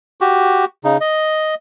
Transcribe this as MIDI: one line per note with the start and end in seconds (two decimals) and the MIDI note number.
0.21 0.65 66
0.21 0.65 67
0.84 0.97 49
0.84 0.97 63
1.01 1.55 75